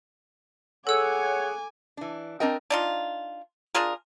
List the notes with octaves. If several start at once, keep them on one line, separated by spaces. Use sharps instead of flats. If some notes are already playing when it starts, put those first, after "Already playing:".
G#4 A4 C#5 F#5 G#5 D6 E6
E3 D4
C4 D4 A#4 D#5 G5
D4 D#4 F4
D4 F4 G#4 A#4